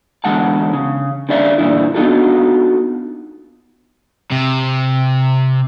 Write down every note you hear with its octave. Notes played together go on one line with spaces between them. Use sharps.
E2 G#2 D3 G#3 F#5 A5
C#3
D3 C#4 D5 E5 F5
G2 A#2 D3 E3 D4 E4
B3 D4 D#4 F4 F#4 A4
C3